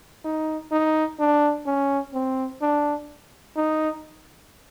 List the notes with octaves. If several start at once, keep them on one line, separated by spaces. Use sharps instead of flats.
D#4
D#4
D4
C#4
C4
D4
D#4